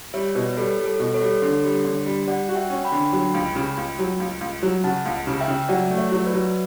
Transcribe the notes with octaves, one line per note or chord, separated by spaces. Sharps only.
G3 C#5 E5
B2 B4 D5
G3 A4 C#5
G3
A4
B2
A4 C#5
G3
D3
G3
D3
G3
G3 D5 F#5
F#4
E5 G5
C#4
G5 B5
D3
F#3
C#2
C#3
C#2
F#3
C#2
C#2
F#3
C#3 F#5 A5
C#2
C#3
E5 G5
C#3
F#3 D5 F#5
A3
C#5 E5
F#3
E5
B4 D5
F#3